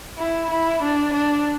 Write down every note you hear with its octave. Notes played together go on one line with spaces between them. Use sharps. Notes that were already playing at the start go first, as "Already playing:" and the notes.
E4
E4
D4
D4